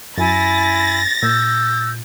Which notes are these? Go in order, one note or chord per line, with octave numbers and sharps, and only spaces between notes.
F#2 E4 G#5 A6 A#6
A#2 E6 G6